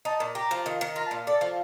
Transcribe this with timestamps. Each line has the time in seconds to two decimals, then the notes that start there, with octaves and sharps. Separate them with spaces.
0.05 D#4 A5
0.20 A#2
0.35 G4 A#5
0.51 F3
0.66 D#3
0.81 D#3
0.96 F4 A#5
1.06 A5
1.11 A#2
1.16 F5
1.27 A4 D5
1.41 F3